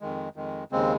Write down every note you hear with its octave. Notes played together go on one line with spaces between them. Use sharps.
F2 D#3 G#3
F2 D#3 G#3
D#2 C#3 G#3 C4